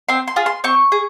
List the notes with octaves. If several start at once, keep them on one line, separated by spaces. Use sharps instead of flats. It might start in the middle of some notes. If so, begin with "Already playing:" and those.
C4 C6
C6
F4 G#4
C6
C4 C#6
G#4